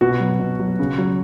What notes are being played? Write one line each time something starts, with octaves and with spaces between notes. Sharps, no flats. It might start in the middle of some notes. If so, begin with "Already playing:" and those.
B2 F#4
F#3
B2
F#3
C#3
F#3